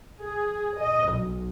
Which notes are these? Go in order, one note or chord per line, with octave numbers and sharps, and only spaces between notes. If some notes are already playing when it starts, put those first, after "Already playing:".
G#4
D#5
B1